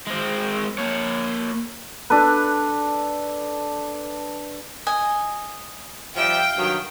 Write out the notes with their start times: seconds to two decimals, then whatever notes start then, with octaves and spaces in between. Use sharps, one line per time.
0.07 G#3 C4
0.78 A#3 C#5
2.10 D4 A4 B4
4.87 D#5 G#5
6.17 F3 G3 E5 F5 G5
6.57 G2 D#3 F#3